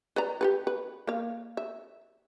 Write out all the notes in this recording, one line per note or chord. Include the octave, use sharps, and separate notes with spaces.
B4 D5 A#5
G4 A4 B4
B4
A#3 F5
E5